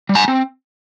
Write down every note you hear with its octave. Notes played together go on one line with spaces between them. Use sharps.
G3
G#5 A#5
C4